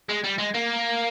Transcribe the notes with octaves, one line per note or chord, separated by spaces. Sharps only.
G#3
G3
G#3
A#3